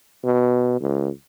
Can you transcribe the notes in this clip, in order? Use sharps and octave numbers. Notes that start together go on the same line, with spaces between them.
B2
C#2